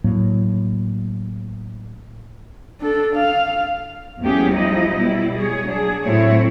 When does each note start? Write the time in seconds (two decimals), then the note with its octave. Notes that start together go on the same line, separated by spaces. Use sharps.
0.04 A2 F#3 A#3
2.81 D4 A4
3.16 F5
4.21 E2 F#3 A3 C#4 G4 G#4
4.52 F3 G3 D#4 E4 D#5
4.97 B2 G3 E4
5.37 G#4 C#5
5.66 F#3 D4 G#4
6.05 A2 F#3 A3 C4 E4 C#5